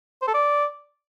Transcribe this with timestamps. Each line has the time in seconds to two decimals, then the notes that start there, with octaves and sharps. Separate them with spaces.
0.22 C5
0.28 A4
0.34 D5